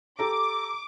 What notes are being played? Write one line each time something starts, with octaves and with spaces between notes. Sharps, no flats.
G4 A4 A#5 D6